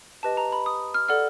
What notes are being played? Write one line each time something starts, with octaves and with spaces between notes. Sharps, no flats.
G4 B4 D#5 A5
A#5
B5
D#6
F6
A4 D5 F#5 F6